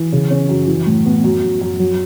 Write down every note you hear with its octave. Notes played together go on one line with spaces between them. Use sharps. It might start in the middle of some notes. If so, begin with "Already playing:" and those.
Already playing: E3
C#3
C#4
F#2
E3
A2
B3
F#2
F#2
F#2
F#3